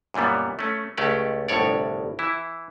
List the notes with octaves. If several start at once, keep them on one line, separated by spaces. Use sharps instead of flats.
F#2 A#2 E3 G3 B3
A3 C#4
C#2 A3 C#4 G4 D5
G1 C2 A2 C#5 D5
E3 E4